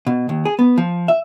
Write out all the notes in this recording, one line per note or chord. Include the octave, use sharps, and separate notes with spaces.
B2
D#2
G#4
B3
F3
E5